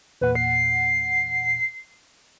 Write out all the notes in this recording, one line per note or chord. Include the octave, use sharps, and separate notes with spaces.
E2 A#2 B4 F#5
C7